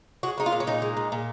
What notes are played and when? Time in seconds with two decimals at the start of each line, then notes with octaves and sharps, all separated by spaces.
0.23 G#3 F#4
0.38 G#3 D#4
0.46 F4
0.52 A#2
0.60 C#4
0.67 A#2 D#4
0.82 G#3
0.97 A#2
1.12 A#2